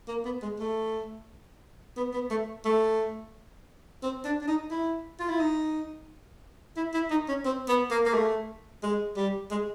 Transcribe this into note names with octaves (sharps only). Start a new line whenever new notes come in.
A#3
B3
G#3
A3
B3
B3
A3
A3
C4
D4
D4
D#4
E4
F4
E4
D#4
E4
E4
D#4
C#4
C4
B3
A#3
A#3
A3
G#3
G3
G#3